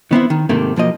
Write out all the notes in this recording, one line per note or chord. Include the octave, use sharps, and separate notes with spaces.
D#3 B3 C4 E4
D#3
G#2 C3 D#3 A3 A#3
B1 F3 A#3 D#5